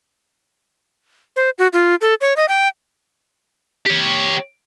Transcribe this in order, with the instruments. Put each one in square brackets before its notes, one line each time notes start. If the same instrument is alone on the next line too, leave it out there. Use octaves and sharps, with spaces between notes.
[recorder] C5
F#4
F4
A4
C#5
D#5
G5
[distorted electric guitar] G4 C#5